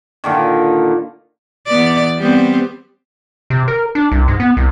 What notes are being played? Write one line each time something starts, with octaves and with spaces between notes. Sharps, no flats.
A#2 D3 D#3
E2 B3 D5
G3 B3 C4
C3
A#4
D4
C2
G#2
B3
C2